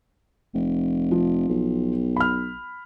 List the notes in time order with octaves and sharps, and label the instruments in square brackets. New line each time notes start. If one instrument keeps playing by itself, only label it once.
[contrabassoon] F1
[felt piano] F3
[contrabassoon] B1
[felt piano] B5 F6